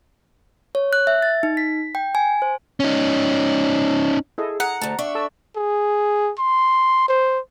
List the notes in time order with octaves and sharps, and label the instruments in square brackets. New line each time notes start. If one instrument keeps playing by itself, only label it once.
[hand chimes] C#5
F#6
E5
A6
D#4
B6
G5
G#5
C5
[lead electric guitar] C#4 D#4
[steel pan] E4 A4 D#5 [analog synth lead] G#4
[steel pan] G#4 [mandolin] F#5 [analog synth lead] A#5
[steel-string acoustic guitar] D2 A3 [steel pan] A5
[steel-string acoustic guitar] D4 E5 [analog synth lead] C#6
[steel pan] A4 A5 E6
[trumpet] G#4
C6
C5